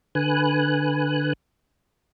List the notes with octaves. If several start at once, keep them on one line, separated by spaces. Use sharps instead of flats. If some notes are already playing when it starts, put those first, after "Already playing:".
D3 B4 G#5 F#6